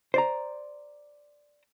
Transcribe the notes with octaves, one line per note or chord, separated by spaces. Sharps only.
C5 D5 A#5